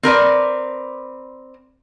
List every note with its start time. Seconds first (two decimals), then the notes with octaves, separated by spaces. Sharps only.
0.03 C4 A#4 B4 D5